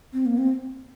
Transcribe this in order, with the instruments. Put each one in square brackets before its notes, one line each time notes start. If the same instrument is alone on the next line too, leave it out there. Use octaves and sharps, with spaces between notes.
[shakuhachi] C4
A#3
C4